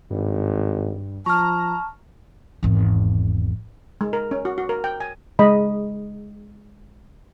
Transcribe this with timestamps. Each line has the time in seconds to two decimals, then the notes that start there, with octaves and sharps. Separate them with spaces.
0.10 G#1 G2
1.26 F3 A5 A#5 C#6 F6
2.63 G#1 E2
4.01 G#3
4.13 A#4
4.31 C#4
4.45 F#4
4.58 F#4
4.69 A#4
4.84 G5
5.00 G#5
5.39 G#3 D#5 B5